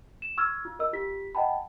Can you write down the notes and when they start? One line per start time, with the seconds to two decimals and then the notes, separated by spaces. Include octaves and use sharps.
0.22 E7
0.38 C#6 E6 F6 G#6
0.65 F4
0.79 A#4 D#5 E6
0.93 F4 G4 B6
1.35 D#5 F#5 G5 A5 B5